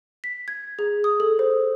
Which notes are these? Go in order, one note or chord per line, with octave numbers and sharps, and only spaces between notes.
B6
G#6
G#4
D#6
A4
C5